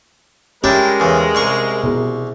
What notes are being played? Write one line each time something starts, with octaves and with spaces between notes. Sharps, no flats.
G#3 C#4 D4 E4 G4 A#4 C#5 G5
E2 C#3
C2 C6 C#6
B2 E4 G#4